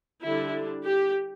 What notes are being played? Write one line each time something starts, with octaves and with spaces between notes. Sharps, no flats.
D3 G3 D4 E4
G4